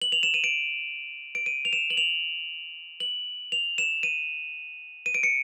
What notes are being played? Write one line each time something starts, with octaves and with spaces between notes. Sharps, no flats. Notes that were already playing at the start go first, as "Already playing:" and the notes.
F#7
F7
E7
D#7
D7
D7
D#7
F7
E7
F#7
F7
F#7
F7
E7
D#7
D#7
D7
C#7